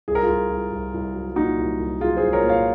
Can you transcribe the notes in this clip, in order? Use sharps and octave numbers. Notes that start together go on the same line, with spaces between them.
C2 G#4
A#4
F4 G#4
C2
C2
C2
C2
F#3
A#2 D#4 F#4
C2
C2
F#3 F4 G#4
G#4 C5
C2
A#4 C#5
A#2
C#5 F5